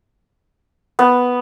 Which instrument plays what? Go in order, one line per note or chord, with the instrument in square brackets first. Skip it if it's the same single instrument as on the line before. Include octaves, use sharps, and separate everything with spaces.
[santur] B3